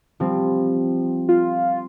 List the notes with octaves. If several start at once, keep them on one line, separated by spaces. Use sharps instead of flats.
F3 G3 C4
F4